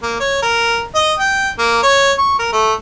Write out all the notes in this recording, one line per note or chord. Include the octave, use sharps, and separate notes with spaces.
A#3
C#5
A#4
D#5
G5
A#3
C#5
C#6
A#4
A3